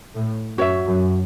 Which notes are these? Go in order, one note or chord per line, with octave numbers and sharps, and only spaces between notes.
A2
F#2 F#4 C#5 E5
F#2